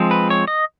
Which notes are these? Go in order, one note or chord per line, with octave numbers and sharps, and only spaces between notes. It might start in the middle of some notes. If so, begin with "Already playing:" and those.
Already playing: F3 G#3 C4
B4
C#5
D#5